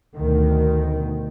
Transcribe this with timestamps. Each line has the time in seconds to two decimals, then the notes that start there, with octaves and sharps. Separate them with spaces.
0.15 D2 B2 D#3